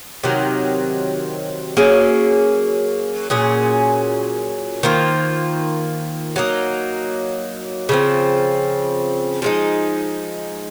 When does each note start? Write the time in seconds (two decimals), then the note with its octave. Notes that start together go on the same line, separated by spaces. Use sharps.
0.23 C3 D#3 F#3
1.77 F#3 A#3 C#4 G#4
3.30 A#2 F#3 C#4 G#4
4.83 D#3 A#3 F4 C5
6.36 F#3 A#3 D#4
7.89 C#3 F3 C4
9.42 F3 G#3 D#4